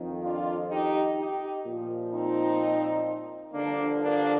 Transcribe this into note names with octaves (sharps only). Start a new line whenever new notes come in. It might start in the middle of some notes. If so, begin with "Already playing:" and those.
Already playing: F2 D#3
D4 F4
D#4 G4
D#4 G4
A#2 F3
C4 D#4
G2 D3 F3 A#3 D4
A#3 D4